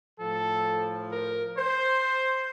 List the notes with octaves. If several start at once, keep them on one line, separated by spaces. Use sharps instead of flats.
A2 F3 A4
A#4
C5